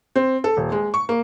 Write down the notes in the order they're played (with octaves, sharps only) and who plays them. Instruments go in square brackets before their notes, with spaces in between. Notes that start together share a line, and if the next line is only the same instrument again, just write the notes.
[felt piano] C4
A4
D#1
G#3
C#6
A#3